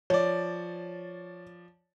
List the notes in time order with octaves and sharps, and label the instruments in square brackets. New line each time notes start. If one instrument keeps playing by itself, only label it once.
[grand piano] F3 D5 [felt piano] C#5